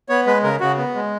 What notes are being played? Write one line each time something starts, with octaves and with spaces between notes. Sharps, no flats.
B3 C#5
G#3 B4
C#3 A#4
C#3 F#4
B3
G#3